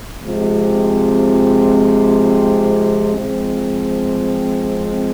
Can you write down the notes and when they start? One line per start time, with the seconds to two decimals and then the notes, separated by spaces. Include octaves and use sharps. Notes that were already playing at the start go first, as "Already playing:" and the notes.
0.21 C3 F3 G#3 C4 F4
3.15 F3 G#3 C4